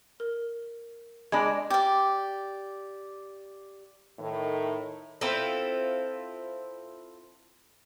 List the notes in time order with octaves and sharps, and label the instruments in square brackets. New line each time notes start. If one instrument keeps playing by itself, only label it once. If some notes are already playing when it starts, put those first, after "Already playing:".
[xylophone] A#4
[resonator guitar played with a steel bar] G#3 D4 [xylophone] D#5 B5 G#6
[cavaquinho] G4 D5
[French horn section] A2 D#3
[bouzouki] C4 E4 F4 A4